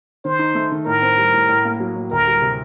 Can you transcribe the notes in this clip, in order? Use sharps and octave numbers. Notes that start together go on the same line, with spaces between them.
D#3 C5
D#4
A3
D#3
A2 A#4
C4
G3
A2
A2
A#3
F#3
A2
D2 A#4
G3
C3